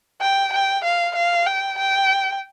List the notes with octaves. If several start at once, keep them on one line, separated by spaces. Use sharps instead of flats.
G5
G5
F5
F5
G5
G5